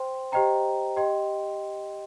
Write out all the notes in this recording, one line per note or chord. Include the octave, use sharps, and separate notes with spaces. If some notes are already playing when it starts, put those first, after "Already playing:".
Already playing: C5 G5 C6
G4 C5 D#5 G5 A#5
G4 D#5 G5 C6